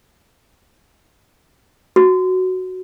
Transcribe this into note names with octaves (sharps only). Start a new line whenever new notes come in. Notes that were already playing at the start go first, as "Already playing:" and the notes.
F#4